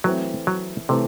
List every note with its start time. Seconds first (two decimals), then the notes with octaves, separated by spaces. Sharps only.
0.04 E3 F#3 A3 C4
0.47 F#3
0.89 C3 E3 A3 C4